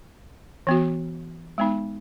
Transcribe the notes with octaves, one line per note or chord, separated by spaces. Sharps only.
E3 B3 F#4
G#3 B3 D#4